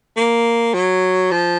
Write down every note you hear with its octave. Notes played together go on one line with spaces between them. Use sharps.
A#3
F#3
F3